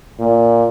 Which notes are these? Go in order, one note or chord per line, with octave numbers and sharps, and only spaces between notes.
A#2